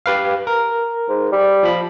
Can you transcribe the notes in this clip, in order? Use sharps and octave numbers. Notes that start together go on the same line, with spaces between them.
G4 B4 F5
A#4
G#2
G3
F3 B5